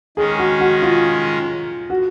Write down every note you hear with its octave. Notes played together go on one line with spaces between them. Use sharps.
D#3 G#3 C#4 G#4
F#4
F#4
F4
F#4